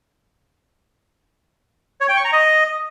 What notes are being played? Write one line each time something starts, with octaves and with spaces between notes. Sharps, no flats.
C#5
G5
C#6
A#5
D#5